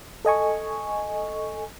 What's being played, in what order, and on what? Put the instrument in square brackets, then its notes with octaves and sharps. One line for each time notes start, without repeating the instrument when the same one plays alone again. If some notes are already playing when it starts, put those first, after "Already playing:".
[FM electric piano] A4 D#5 G#5 C#6